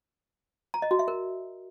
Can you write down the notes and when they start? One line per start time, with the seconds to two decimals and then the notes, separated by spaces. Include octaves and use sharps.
0.74 A#5
0.82 D#5
0.91 F#4
0.99 E5
1.08 A#4